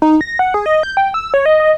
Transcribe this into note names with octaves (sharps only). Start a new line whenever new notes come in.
D#4
A#6
F#5
G#4
D#5
G6
G5
E6
C#5
D#5
D#5